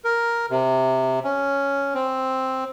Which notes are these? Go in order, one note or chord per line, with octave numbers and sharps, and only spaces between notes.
A#4
C3
C#4
C4